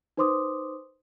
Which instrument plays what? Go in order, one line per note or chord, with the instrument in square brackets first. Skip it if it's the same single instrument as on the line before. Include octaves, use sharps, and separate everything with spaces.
[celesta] D#4 B4 C5 C6 D6 D#6